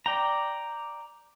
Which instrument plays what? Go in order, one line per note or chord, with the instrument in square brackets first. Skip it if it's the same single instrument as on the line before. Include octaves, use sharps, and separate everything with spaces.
[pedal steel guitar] D5 G5 A#5